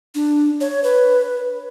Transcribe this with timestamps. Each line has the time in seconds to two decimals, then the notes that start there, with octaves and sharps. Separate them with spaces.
0.15 D4
0.61 C#5
0.84 B4